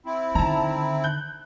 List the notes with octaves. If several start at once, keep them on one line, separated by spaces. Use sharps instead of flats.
C4 E4
D3 D#3 A5 A#5
F#6 G6